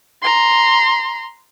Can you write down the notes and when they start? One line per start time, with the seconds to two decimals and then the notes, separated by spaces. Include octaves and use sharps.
0.22 A#5 C6